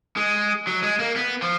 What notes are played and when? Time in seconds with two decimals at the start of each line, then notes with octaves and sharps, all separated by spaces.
0.17 G#3
0.67 F#3
0.83 G#3
0.99 A#3
1.16 B3
1.42 F3